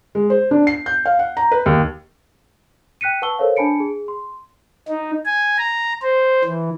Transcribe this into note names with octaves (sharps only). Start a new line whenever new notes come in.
G#3
C5
D4
C7
G6
F5
F#5
A#5
B4
D#2
G5 F#6 B6 C#7 D#7
B4 F#5 A5 C#6 E6 G7
A4 A#4 C5 C#5 F5
D4 G#5 A5 B5 C#7 D7
G#4
C6
D#4
G#5
A#5
C5
E3